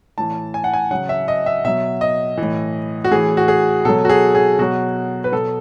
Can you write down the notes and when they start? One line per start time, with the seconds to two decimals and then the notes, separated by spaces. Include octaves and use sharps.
0.18 A2 E3 A5
0.54 G#5
0.64 F#5
0.74 G#5
0.91 C#3 F#3 F#5
1.09 E5
1.28 D#5
1.46 E5
1.65 B2 F#3 E5
2.01 D#5
2.38 E3
2.43 A2
3.04 F#4
3.11 A2 E3 G#4
3.37 F#4
3.48 G#4
3.85 B2 F#3 A4
4.05 F#4
4.09 G#4
4.35 G#4
4.59 B2 F#3 F#4
5.24 B4
5.32 B2 F#3 A4